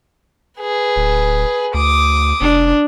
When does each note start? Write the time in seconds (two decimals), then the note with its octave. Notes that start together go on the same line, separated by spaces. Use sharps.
0.60 G#4 B4
0.96 D1
1.74 D2 D6 D#6
2.41 F1 D4